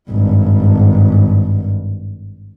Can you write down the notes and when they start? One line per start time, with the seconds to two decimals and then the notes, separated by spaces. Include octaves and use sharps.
0.11 G#1 G2